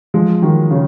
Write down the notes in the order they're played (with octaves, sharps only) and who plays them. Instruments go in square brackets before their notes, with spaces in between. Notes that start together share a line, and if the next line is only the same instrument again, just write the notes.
[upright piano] F3 G#3
D#3 F#3
C#3